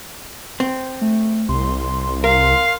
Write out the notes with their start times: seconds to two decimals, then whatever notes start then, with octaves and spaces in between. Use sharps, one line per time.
0.60 C4
1.01 A3
1.49 C2 C6
2.24 A#4 F5